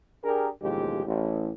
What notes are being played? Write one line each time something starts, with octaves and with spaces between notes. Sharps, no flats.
D4 G4 G#4 A#4
A1 D#2 B2 F3 G#3 G4
A1